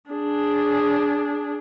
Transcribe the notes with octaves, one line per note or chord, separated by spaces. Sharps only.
D4 G#4